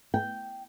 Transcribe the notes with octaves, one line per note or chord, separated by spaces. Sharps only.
G5